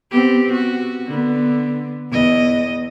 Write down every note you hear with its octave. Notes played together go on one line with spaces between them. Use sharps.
B3 C4 G4
F#4
D3 B3
E2 D#5